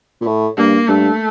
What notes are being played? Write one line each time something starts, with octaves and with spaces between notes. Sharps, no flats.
A#2
A2
G2 A#3
G2 A3